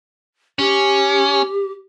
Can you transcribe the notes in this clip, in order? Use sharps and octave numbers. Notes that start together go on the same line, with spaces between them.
C#4 G4